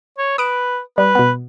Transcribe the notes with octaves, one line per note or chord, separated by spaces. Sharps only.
C#5
B4 D#6 D7 E7
G3 B4
B2 B3